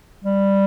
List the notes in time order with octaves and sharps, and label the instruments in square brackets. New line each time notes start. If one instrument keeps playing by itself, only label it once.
[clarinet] G3